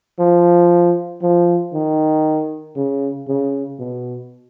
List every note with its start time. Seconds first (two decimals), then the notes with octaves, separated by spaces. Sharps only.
0.19 F3
1.22 F3
1.73 D#3
2.76 C#3
3.28 C#3
3.79 B2